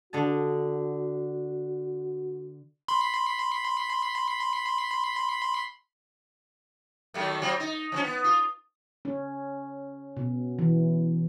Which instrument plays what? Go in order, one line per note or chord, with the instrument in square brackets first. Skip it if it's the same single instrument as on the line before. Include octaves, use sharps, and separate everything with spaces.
[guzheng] D3 D#5 A5 [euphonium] F#4
[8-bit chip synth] B5 C6
[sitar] D#3 F#3 A3
F#3 C4 F4
D#4
F3 C4 C#4
B3
F4
[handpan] C#4
B2
E3